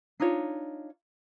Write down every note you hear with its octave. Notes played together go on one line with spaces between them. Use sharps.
D4 D#4 F4 C#5